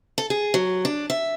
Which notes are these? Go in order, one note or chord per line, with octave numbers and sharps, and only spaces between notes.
A4
G#4
F#3
D4
E5